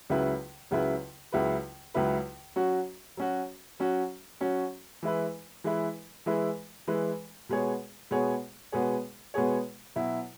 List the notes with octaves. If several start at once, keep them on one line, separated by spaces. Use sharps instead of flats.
C#2 C#3 F#3 E4 B4
C#2 C#3 F#3 E4 B4
C#2 C#3 F#3 E4 B4
C#2 C#3 F#3 E4 B4
F#3 C#4 F#4
F#3 C#4 F#4
F#3 C#4 F#4
F#3 C#4 F#4
E3 G#3 E4 B4
E3 G#3 E4 B4
E3 G#3 E4 B4
E3 G#3 E4 B4
B2 G#3 B3 G#4 C#5
B2 G#3 B3 G#4 C#5
B2 G#3 B3 G#4 C#5
B2 G#3 B3 G#4 C#5
B2 F#3 E4